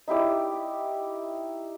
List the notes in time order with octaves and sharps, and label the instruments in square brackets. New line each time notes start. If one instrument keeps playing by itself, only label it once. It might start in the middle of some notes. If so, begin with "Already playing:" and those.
[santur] D#4 E4 G4 D5